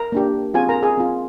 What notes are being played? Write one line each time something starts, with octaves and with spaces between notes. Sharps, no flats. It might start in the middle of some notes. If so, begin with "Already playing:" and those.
Already playing: A#4 A#5
A#3 D4 G4
C4 F4 G#4 G#5
A#4 A#5
G#4 G#5
C4 F4